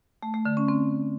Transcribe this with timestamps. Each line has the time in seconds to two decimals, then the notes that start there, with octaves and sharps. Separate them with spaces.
0.23 A3
0.34 A3
0.45 D3
0.57 C#4
0.68 C4